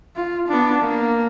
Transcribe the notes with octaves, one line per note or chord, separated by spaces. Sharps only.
F4
B3 D4
A#3